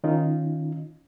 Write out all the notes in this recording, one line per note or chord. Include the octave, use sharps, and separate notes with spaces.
D#3 C#4 D#4 F4